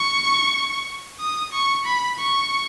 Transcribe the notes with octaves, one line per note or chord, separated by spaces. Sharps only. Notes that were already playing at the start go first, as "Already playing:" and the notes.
Already playing: C#6
D#6
C#6
B5
C#6